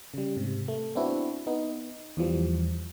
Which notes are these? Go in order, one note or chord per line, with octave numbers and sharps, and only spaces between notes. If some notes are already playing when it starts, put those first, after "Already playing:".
C#3 G3
G#2 C3
A3
B3 C4 D4 E4 F#4
B3 D#4
E2 E3 F3 G3